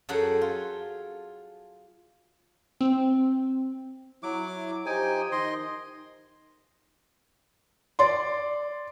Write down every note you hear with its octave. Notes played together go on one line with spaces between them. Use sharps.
F#2 G#4 A4 F#5 G5
F4
C4
F#3 E4 D6
F3 D#4 G4 C5 G5 G#5
D#3 D#4 D#5 C6
D5 C6